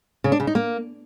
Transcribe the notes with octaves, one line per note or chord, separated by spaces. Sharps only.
C#3
D4
C#3
D#4
A#3